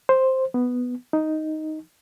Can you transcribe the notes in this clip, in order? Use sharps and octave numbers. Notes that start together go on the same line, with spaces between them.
C5
B3
D#4